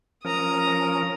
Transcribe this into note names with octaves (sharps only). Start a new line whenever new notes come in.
F3 C#4 A#4 A#5 D#6